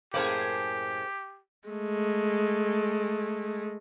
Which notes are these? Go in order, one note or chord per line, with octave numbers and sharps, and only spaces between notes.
F#2 A2 A#3 G4 G#4 C5 D5
G#3 A3